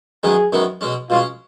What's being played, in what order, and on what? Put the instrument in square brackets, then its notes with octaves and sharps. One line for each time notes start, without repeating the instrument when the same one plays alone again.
[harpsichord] F#2 D#3 G#3 B3 [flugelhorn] G#4
[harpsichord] F#2 D#3 G#3 B3
B2 G#3 C#4
[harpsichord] B2 G#3 C#4 [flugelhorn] F4